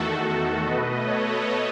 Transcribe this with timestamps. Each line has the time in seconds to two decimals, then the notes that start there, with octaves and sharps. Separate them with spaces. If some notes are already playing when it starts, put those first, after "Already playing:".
Already playing: E2 D#3 A3 F#4 A4
0.65 B2 A3 B4 D#5
1.06 A4 C#5